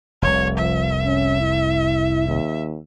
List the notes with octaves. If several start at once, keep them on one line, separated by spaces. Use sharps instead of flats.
F1 C2 C#5
F3 E5
C#4
E4
D#2